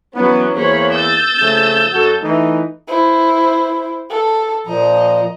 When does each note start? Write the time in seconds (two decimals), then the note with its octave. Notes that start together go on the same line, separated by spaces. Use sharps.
0.15 E3 F#3 B3 C#4
0.55 E2 A#3 C5 C#5 B5
0.91 E6 G6 A6
1.41 C#3 F3 A3
1.92 F#2 F#4 A4
2.21 E3 A3 D#4
2.88 E4 C5
4.10 A4
4.67 A#2 F3 D#5 A#5